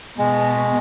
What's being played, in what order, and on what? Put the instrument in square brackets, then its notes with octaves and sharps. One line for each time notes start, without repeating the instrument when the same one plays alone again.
[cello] B2 [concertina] G#3